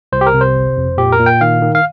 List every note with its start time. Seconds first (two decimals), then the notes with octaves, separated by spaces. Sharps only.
0.12 C2 C5
0.21 G4
0.27 A#4
0.34 C3
0.41 C5
0.55 G1
0.77 F2
0.98 A#2 G4
1.12 A#4
1.19 A#2
1.26 G5
1.41 D#3 F5
1.62 D#3
1.75 F5